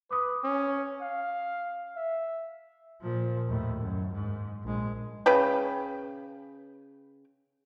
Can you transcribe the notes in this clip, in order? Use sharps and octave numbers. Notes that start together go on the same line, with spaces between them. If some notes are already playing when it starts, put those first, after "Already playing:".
B4 D6 D#6
C#4
F5
E5
A#2 F3
D#2 A2
F#2
G#2
A#1 G#3
C#3 C#4 B4 G5